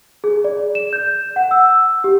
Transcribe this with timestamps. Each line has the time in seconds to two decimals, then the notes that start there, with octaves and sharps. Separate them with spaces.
0.24 G#4
0.44 D5
0.75 E7
0.93 G6
1.36 F#5
1.51 E6
2.04 G4